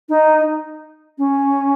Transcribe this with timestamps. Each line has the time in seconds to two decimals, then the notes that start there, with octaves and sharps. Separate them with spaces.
0.09 D#4
1.18 C#4